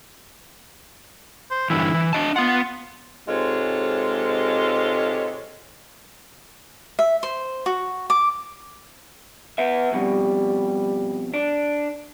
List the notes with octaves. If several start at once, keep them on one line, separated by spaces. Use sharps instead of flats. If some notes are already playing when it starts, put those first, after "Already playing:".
C5
G2 D3 E3 E4
E3
D4 D#5 A5
B3 F4 F#5
G#2 C3 G#3 F4 A4 C#5
E5
C5
F#4
D6
B3 E5
F2 B2 G3
D4